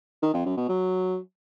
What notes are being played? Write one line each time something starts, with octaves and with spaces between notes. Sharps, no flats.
D#3
F2
F#2
B2
F#3